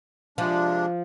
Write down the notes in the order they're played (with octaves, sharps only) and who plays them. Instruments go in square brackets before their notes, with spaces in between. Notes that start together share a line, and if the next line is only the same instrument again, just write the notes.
[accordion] C3 G#3 D4 [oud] F3